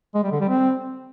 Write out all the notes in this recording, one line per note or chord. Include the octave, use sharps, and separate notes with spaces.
G#3
G3
D3
G3
C4